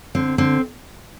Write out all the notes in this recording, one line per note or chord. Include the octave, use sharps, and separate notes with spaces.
D3 C4
D3 C4